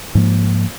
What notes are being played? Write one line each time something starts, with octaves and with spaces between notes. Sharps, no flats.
G#2 F3 A#3